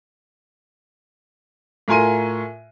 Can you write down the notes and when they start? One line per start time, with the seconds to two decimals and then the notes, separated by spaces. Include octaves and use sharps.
1.88 A2 F4 A#4 G#5 C6 D#7